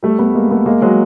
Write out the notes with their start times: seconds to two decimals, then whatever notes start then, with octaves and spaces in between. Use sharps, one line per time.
0.03 G3 A3
0.19 A3 B3
0.34 G#3 A#3
0.51 A3 B3
0.66 G#3 A#3
0.82 F#3 G#3